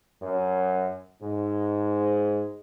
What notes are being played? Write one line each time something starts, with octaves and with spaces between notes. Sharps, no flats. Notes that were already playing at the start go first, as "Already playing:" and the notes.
F#2
G#2